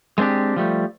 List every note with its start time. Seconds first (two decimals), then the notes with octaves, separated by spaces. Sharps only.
0.18 G#3 A3 C4 D4 G4
0.56 F3 G3 A3